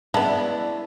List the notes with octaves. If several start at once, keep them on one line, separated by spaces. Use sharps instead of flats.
G#3 B3 C#4 D4 E4 D5 A5